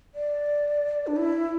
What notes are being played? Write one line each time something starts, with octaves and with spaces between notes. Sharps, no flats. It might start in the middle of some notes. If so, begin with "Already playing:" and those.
D5
D4
E4